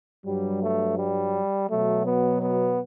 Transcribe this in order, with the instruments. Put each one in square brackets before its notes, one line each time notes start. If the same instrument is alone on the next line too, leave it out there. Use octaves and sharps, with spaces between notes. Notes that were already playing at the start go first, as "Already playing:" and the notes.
[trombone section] G2 F#3 G3
A3
G3
B2 F#3 A3
B3
B3